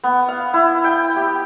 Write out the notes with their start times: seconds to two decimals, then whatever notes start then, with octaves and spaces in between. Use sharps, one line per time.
0.04 B3
0.28 F5
0.54 E4
0.84 G5
1.16 G4